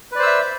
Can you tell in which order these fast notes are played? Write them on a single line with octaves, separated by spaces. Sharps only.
B4 D5 C5 E6 E5